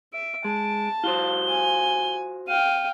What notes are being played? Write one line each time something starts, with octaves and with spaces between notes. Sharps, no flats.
E5 D7
G#3 A5
F4 F#4 C5 G7
G#5
F5 G5 D#7